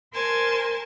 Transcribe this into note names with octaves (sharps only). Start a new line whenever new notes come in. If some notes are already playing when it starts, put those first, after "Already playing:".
A#4 C5 G#5 A5 C6